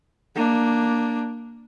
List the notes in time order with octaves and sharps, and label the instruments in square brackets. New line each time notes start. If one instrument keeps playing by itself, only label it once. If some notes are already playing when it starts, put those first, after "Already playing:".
[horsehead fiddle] A#3 D4